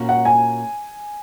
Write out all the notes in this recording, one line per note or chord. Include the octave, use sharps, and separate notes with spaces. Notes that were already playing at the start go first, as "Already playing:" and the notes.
Already playing: A#2 A#3 C#4 F#4
F#5
G#5